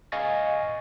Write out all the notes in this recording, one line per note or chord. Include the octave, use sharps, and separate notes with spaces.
D#5 F5 G#5 C#6 A6 A#6